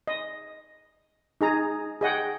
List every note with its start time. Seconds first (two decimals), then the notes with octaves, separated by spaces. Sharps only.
0.07 D#5
1.41 D#4 G#4 A#5
2.01 G#4 D#5 F#5 G5